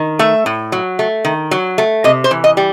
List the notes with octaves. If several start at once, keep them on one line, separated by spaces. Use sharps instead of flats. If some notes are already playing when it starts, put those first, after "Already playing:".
Already playing: D#3
A3 E5
A2
F#3
A3
D#3
F#3
A3
C3 D#5
C5
E3
D#5
G3